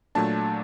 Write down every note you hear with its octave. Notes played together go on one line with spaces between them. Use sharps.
A#2 F#3 A3 D4 A5